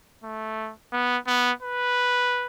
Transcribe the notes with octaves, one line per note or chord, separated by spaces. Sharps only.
A3
B3
B3
B4